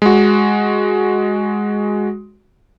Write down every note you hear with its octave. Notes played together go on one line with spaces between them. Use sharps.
G#3 F#4